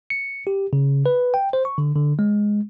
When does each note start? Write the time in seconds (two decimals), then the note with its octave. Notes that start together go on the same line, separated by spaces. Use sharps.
0.10 C#7
0.47 G4
0.73 C#3
1.06 B4
1.34 G5
1.53 C5
1.65 C#6
1.78 D3
1.96 D3
2.19 G#3